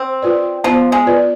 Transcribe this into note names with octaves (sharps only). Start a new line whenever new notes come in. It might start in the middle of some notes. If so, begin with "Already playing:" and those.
Already playing: C4
F4 B4 D5
F3 B3
G#3
F4 B4 D5